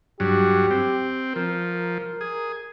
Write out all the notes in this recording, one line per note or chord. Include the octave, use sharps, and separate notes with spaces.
G2 F#3 G4
C4
F3 A#4
G#4